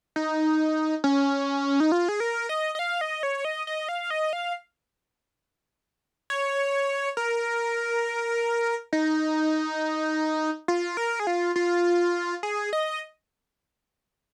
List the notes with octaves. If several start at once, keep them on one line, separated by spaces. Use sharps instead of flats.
D#4
C#4
D#4
F4
G#4
A#4
D#5
D#5
F5
D#5
C#5
D#5
D#5
F5
D#5
F5
C#5
A#4
D#4
F4
A#4
G#4
F4
F4
G#4
D#5